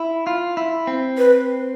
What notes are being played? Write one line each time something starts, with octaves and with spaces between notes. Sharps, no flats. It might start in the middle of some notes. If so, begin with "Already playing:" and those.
Already playing: E4
F4
E4
C4
B4